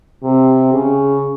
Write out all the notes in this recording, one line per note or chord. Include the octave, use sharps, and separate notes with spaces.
C3
C#3